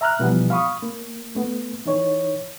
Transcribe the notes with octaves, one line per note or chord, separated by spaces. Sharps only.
E5 A#5 F6 F#6
B2 E3 F3 G3 B3
F5 B5 C#6 D#6
A#3
A3 B3
E3 D#4 C#5